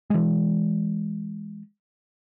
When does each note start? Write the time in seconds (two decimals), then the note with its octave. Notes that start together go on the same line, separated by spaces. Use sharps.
0.10 E3 G#3